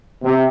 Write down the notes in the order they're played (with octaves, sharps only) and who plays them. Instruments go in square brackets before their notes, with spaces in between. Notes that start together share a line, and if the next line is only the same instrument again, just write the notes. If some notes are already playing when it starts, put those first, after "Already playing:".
[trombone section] C3